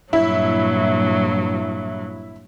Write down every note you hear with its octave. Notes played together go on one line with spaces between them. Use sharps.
G2 A#2 F#3 E4